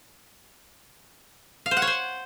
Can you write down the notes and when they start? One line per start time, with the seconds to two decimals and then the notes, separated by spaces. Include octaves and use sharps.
1.66 F5
1.71 C5
1.77 F#5
1.82 C#5
1.87 C5